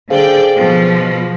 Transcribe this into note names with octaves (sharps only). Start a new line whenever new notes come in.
D3 G#4 C5 D5 F5 G5
B2 F3